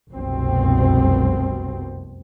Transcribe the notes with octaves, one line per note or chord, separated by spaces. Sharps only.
F1 C2 F#2 B2 C4